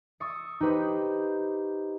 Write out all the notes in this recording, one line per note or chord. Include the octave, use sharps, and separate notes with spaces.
C#6 D#6 E6 A6 C#7
D#4 G4 B4 C5